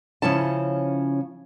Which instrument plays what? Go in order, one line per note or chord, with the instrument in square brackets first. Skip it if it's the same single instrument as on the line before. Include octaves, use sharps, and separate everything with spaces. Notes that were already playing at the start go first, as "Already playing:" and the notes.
[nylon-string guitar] C#3 F3 C#4 E4 A5